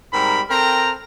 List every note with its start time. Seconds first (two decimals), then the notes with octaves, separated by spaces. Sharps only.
0.13 G#2 G3 C4 A#4 B5
0.50 C4 A4 A#4 G5 A#5